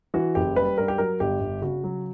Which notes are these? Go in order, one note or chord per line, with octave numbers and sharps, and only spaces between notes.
E3 F#4
F#1 G4
G3 B4
G2 A#4
G4
F#3 A#4
G1 G4
G1
C#3 F#4
F#3